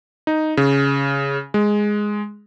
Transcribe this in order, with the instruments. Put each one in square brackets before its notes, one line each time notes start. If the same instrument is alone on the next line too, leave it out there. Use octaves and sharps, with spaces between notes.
[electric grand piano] D#4
C#3
G#3